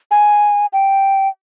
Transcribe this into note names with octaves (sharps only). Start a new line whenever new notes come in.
G#5
G5